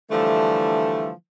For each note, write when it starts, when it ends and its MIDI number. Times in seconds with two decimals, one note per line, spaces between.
0.11 1.11 50
0.11 1.11 52
0.11 1.11 53
0.11 1.11 55
0.11 1.11 57